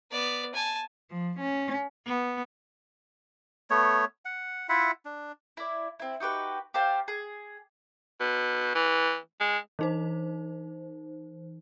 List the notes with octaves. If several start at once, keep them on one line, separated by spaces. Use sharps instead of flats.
B3 D5
G#5 A5
F3
C#4
B3
A3 B3 C#5
F#5
E4 F4 E5 F#5
D4
E4 D5
C4 E4
D#4 F#4 G4 B4
G4 C5 F5 A5
G#4
B2
E3
G#3
E3 D#4 C5